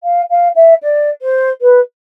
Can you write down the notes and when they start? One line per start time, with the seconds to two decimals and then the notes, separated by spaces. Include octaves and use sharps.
0.03 F5
0.30 F5
0.55 E5
0.82 D5
1.21 C5
1.61 B4